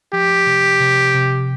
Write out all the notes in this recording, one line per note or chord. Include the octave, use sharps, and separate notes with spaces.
F3 G4
C3
C3
C3